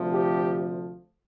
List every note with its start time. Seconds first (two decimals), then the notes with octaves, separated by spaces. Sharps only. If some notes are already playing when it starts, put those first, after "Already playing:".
Already playing: D2 C3 F3 A3
0.11 G4